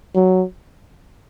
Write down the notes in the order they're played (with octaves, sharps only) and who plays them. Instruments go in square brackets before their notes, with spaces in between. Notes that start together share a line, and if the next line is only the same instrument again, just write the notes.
[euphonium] F#3